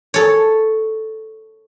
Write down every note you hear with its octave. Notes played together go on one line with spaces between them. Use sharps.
A4 C#5